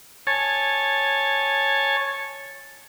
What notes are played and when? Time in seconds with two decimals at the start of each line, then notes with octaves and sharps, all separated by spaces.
0.27 C#5 G#5 A5